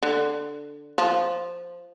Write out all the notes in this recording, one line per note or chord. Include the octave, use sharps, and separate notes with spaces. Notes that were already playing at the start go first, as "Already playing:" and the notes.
D3
F3